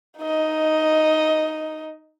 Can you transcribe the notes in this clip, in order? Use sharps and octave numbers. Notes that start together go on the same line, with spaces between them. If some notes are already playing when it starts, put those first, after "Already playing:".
D#4 D#5